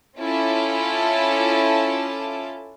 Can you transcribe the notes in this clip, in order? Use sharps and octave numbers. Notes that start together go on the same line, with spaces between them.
C#4 E4 F4 A4 A5 D6